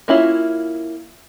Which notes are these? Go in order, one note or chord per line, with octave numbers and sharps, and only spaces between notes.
A#3 C#4 E4 F4